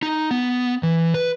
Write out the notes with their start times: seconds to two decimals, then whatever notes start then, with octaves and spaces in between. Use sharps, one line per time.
0.03 D#4
0.31 B3
0.83 E3
1.14 B4